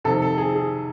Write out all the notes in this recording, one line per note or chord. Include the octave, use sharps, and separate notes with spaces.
F2 C3 D#3 A4
A4
G#4
G#4